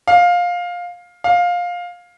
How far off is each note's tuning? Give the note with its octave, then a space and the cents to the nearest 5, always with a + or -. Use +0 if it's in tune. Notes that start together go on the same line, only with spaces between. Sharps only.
F5 +15
F5 +15